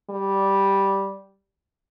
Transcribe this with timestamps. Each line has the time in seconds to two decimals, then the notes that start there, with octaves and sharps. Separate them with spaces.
0.10 G3